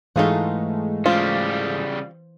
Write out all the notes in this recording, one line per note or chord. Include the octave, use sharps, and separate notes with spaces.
G#2 E3 G#3 A3 D#4 F4 F#4 F5
C#3 G3 F4 C5